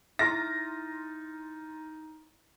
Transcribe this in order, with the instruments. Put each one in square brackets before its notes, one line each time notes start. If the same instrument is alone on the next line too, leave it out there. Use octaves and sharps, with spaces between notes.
[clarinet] D#4 [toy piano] E4 G#4 E5 [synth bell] C6 F6 A6 [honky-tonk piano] A#6